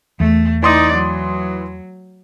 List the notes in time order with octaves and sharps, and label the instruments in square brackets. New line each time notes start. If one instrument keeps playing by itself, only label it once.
[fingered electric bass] E2 [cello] A3
[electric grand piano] E3 C6 D#6 [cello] D#4 D5
[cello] F#3